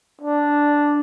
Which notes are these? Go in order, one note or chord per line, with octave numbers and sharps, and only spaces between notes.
D4